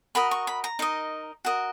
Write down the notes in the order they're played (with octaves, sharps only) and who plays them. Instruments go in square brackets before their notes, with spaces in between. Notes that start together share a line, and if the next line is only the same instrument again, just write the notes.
[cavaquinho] F#4 A#4 D#5 B5
C#6
B5
A#5
D#4 A#4 D#5
F#4 A#4 D#5